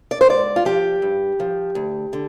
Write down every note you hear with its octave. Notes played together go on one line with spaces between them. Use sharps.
D5
C5
G#2 D5
F4
F3 G4
G2
F3
D2
D3